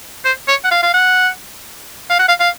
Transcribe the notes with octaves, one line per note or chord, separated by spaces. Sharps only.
C5
C#5
F#5
F5
F5
F#5
F5
F#5
F5
F5